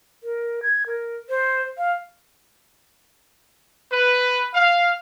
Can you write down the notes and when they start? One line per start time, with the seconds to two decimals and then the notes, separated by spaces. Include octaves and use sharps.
0.23 A#4
0.63 G#6
0.86 A#4
1.29 C5
1.78 F5
3.91 B4
4.54 F5